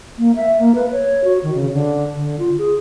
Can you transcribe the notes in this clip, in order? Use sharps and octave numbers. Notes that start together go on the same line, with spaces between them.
A#3
E5
A#3
B4
C#5
F#4
D#3
C#3
D3
D3
F4
G#4